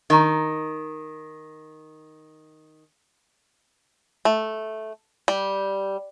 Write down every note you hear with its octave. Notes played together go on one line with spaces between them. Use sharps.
D#3 D#5 A#5
A3
G3